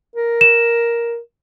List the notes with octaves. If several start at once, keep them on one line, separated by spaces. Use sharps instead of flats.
A#4
E7